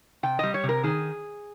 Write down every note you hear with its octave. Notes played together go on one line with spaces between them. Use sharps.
C3 G5
G3 D#5
C#5
C3
A#4
D#3 G#4